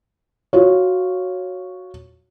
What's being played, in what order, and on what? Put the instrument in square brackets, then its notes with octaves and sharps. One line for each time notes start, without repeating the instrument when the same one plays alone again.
[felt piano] F4 F#4 C#5